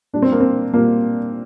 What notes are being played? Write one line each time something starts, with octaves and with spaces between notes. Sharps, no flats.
A#2 G3 D4
C4
A#3
C4
A#2 G3 A#3